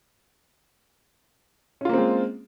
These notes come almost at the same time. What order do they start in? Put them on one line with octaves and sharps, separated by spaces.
C#4 F4 A#3 C4 G#3